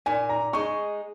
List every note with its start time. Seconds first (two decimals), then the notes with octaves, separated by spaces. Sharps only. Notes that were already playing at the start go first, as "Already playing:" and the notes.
0.06 A#2 G#5
0.29 A#5
0.53 G#3 D#4 C#6